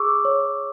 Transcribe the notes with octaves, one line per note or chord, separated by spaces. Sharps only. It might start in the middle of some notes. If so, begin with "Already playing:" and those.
Already playing: G#4 C#6 D6 E6
C#5